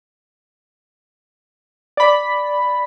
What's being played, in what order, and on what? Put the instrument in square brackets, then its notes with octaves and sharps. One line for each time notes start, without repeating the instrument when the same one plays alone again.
[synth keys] D5 B5